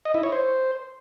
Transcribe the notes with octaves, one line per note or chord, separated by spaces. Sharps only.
D#5
E4
C#5
C5